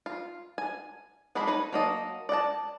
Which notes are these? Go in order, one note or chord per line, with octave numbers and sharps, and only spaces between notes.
F4
G#5
F3 G#3 G4 C5 B5
D#4 B4 C#5
F#3 A#3 D#5 A5
D5 D#5 F#5 A5